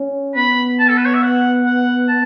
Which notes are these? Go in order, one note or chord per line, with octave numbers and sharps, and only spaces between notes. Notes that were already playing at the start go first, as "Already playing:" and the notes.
Already playing: C#4
B3 B5
A5
A4
B4
C#5
E5
F#5
F#5
A5